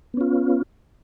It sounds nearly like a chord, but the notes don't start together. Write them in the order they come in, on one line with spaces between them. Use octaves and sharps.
B3 C#4 F4